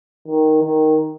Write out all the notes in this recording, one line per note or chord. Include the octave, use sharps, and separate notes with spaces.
D#3
D#3